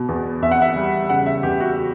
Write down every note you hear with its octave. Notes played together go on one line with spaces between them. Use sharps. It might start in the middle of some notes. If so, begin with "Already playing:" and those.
Already playing: B2
E2
E2 E5
F#5
E5
G3
C#3 F#5
E5
E2 G4
F#4